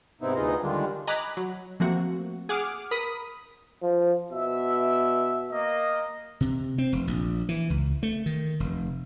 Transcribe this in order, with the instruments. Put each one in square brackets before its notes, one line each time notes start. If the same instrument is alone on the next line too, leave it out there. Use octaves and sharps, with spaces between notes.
[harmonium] G#2 C3 B3 C4 D#4 E4
D2 B3 D#4 F4 G#4 D#5
D3 D#3 G3 G#3 D4 F4
[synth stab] D#5 G#5 A#5 B5 D6 F#6
F#3
F3 A3 A#3 C4 F#4
G#4 F#5 D6 F6
A#4 B5 D#6 B6
[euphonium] F3
[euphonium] B2 [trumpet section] E5
[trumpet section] A#3 D#5
[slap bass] C3
C4
F1
A#1
E3
C#2
A3
D#3
F1